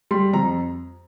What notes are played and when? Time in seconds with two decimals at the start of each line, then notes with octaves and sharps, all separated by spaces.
0.11 G3 C6
0.33 F2 A#5